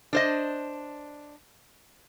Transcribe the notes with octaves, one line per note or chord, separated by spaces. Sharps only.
D4 C5 D#5